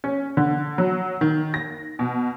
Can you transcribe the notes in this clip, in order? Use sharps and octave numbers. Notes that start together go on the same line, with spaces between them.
C#4
D3
F#3
D#3
A#6
B2